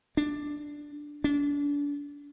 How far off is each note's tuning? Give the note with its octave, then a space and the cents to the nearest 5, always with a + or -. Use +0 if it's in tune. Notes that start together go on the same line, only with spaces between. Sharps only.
D4 +5
D4 -35